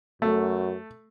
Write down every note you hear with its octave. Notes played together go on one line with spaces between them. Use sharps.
F#2 A3